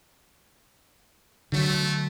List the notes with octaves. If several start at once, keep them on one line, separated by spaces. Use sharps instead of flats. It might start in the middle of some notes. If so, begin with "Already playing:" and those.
D3 F#3 A3